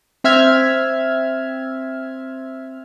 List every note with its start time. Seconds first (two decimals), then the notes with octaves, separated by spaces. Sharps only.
0.24 C4 E5 F6 G#6